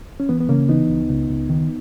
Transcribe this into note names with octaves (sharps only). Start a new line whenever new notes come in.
C#4
E3 B3
B3
C#3 A#3 C#4
E3 B3 D#4
C#2
C#2
C#2
D#3